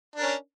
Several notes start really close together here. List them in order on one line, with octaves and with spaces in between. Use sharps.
D4 A#4 C#4